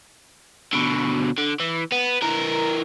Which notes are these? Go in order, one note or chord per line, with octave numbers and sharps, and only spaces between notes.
B2 D3
D3
E3
B3
E3 A#4